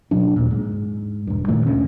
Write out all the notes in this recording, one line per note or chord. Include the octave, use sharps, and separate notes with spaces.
B2 F#3 D4
D#2 A#2
G#2
E1 G2
G2 A#2 D#3 A3
D#1 D2 D3 C#4